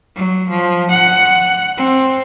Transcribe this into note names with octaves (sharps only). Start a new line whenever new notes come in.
F#3
F3
F#5
C4